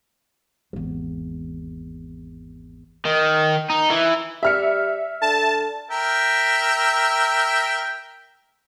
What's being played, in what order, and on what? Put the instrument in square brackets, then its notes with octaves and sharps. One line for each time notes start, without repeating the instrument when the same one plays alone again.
[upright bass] G#1 E2
[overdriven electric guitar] D#3
D#4
E3
[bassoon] G3 [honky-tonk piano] E5 F6 C#7
[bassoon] D3 [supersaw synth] A5
[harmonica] A#4 E5 G5